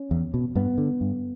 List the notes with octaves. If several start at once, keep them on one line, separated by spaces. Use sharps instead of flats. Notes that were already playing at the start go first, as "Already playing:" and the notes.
Already playing: C#4
E2
B2
G2 B3
D3
G2